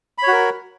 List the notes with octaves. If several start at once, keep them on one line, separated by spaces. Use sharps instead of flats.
F#4 A#4 C#5 B5